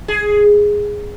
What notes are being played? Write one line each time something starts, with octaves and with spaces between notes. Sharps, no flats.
G#4